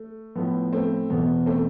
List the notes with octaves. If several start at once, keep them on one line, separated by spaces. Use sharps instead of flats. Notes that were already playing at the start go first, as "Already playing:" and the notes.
Already playing: A3
A2 F3 B3
A3 C4
E2 B2 B3
A3 C4